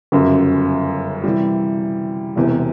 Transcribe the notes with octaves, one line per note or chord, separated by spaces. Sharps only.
G1 F#2 C#3
C3 E3 G3
E1 E2 C3